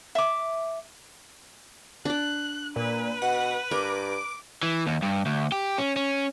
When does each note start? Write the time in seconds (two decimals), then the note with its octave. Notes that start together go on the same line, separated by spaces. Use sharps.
0.15 E5 D6
2.05 D4 D5 F#6
2.76 A#2 B4
3.22 B2 F#5
3.71 G2 A#4 D6
4.63 E3
4.87 D#2
5.02 G2
5.26 D2
5.52 G4
5.78 C#4
5.96 C#4